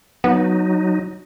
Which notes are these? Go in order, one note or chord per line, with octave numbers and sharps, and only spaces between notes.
F#3 B3 D#4